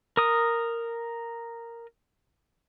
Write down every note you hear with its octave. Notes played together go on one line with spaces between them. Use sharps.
A#4 D#6